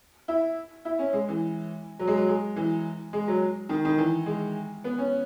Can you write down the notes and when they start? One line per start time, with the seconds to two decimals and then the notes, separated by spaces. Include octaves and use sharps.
0.28 E4
0.85 E4
0.99 C#4
1.13 G#3
1.28 E3
1.99 F#3
2.07 G#3
2.17 F#3
2.28 G#3
2.56 E3
3.13 G#3
3.28 F#3
3.69 D#3
3.85 D#3
3.98 E3
4.26 G#3
4.84 B3
4.98 C#4